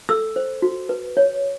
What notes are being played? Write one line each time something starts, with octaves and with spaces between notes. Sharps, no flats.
A4 E6
C5
F#4
B4
C#5